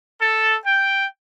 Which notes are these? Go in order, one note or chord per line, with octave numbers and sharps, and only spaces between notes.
A4
G5